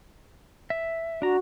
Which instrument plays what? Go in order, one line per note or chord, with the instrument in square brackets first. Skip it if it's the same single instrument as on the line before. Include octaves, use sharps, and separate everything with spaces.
[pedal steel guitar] E5
[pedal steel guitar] D4 A#5 [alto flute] F#4